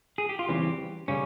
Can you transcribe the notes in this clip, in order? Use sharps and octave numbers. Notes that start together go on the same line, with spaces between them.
G#4
G4
F4
E2 C#3 E3 G3 C4 G4
C#3 G3 C#4